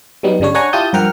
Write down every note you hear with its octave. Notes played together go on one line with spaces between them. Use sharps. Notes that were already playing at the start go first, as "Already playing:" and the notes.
F#3 G3 B3 D#4
G1 C#3 G3 D4 C#5
D4 C#5 F#5 G#5 A#5 C#6
E4 F4 G4 A5 D#6 G6
G2 F3 A#4 F#5 G5 F6